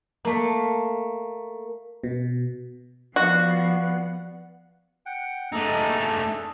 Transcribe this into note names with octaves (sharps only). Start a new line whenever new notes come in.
A3 A#3
B2
F3 B3 F#4 D5 F5 F#5 C#7
F#5 G5
A3 D4 D#4 G#4 A4